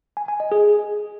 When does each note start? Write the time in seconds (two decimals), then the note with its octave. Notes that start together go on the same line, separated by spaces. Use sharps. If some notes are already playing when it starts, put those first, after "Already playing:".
0.17 G#5
0.28 G#5
0.40 D#5
0.52 G#4